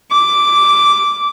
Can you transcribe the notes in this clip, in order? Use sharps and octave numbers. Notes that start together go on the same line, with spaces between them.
D6